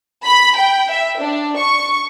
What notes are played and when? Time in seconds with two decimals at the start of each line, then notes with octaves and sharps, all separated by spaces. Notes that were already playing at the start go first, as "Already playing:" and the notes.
0.24 B5
0.56 G5
0.90 E5
1.20 D4
1.57 C#6